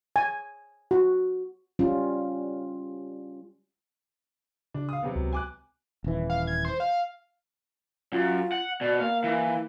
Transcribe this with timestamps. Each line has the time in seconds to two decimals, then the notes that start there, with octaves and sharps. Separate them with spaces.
0.16 G#5
0.91 F#4
1.79 G3 C#4 F4
4.74 C#3 D4
4.89 F5 D#6
5.03 C3 F#3 B3
5.15 C#2
5.33 G#5 D6 F#6
6.04 D#1 E3
6.30 F5
6.47 G#6
6.65 C5
6.80 F5
8.12 F#2 F4
8.52 F#5
8.81 B2 D5
9.01 A#3 F5
9.24 E3